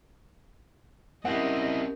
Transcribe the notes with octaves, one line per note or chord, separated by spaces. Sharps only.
C4 C#4 E4 G4 A#4 D#5 F#5